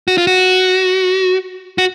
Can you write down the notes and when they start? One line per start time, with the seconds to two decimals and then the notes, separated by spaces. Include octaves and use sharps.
0.08 F#4
0.18 F4
0.27 F#4
1.78 F#4